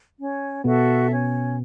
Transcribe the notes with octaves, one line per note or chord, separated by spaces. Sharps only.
C#4
B2 B3 F#4 A4 E5
C#4